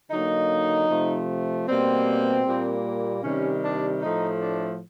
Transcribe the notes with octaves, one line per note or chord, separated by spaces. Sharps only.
D3 F#3 A#3 D#4
C3 F3 A3
B2 G3 A#3 C4
A#2 G3 A#3
C3 D#3 G3 C#4
D4
A2 F3 A3 D#4
D4